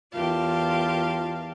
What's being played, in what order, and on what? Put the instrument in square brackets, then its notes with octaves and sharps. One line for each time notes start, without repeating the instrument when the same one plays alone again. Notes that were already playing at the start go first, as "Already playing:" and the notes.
[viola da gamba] E2 G4 A#4 [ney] F4 [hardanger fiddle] F5 A5